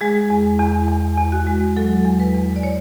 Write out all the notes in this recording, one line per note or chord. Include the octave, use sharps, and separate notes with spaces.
G#3 G#4
E2
E2
E2
E2
F#4
G#3
F#3 A4
E2
B4
E2
D5
C#5